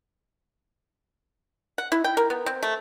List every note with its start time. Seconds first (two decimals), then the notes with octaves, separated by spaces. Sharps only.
1.78 F#5
1.92 E4
2.04 G5
2.17 A#4
2.30 B3
2.46 C4
2.63 A3